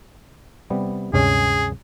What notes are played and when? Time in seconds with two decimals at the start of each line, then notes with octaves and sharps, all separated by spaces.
0.70 C3 G3 B3
1.13 D2 G2 C3 G#3 C#4 G#4